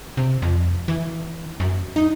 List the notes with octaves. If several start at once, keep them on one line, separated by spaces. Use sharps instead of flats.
C3
F2
E3
F#2
D#4